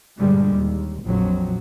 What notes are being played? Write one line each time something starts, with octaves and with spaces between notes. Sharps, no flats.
G2 A#2 D3 G3 G#3
D#2
A#1 F2 F#3